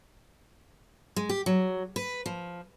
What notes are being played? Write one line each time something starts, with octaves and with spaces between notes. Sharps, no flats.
G#3
G4
F#3
B4
F3